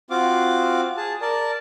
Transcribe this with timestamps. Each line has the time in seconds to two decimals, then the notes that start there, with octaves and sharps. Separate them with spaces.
0.10 C4 F4 F#4 F5 D6
0.97 G#4 A5
1.22 A#4 D5 A5